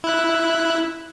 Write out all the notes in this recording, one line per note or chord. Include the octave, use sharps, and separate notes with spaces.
E4 F#6